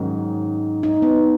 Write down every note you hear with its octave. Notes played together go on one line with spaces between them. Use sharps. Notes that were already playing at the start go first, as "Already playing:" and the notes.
Already playing: G#2 D#3 F#3 C#4
D#4
B3